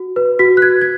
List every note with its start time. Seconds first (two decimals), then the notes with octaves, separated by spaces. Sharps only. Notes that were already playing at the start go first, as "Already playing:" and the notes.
Already playing: F#4
0.16 B4
0.39 F#4 B6
0.57 F#6
0.62 B4 G#6
0.81 G#6